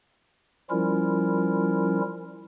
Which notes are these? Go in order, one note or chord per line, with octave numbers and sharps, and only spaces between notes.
F3 G3 C#4 E4 F4 A#4